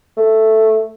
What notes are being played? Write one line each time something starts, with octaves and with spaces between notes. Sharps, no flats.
A3